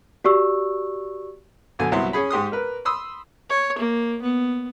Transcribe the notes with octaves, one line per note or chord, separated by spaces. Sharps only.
F#4 G4 D5 C#6 E6
B1 D3 G#5
C2 F#3 B3 E4 F#4 C6
C#4 G#4 B5
G#2 G4 C6 D#6
A#4 B4
B5 C6 D#6 E6
C#5
A#3
B3